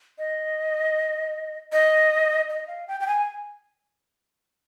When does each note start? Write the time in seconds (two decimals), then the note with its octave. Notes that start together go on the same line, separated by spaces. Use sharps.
0.18 D#5
1.72 D#5
2.50 D#5
2.68 F5
2.88 G5
3.00 G5
3.07 G#5